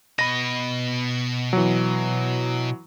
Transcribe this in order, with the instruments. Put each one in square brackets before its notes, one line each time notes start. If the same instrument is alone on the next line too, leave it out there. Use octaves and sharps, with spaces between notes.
[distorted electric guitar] B2 D#5 [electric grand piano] B5 A#6
[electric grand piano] E3 F#3